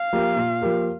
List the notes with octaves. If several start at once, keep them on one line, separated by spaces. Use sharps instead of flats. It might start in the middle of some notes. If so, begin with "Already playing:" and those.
Already playing: F5
F3 A#3 G4 A#4
A#2
F3 A#3 G4 A#4